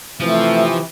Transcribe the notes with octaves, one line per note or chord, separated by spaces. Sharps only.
C3 E3 F3 A3